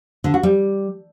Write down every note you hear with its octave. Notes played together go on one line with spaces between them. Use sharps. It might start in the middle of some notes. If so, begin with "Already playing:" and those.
D3
F#4
G3